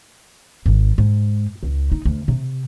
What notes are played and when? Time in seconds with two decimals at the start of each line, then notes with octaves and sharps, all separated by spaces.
0.66 G#1
0.98 G#2
1.63 C#2
1.92 D#4
2.05 D2
2.28 C3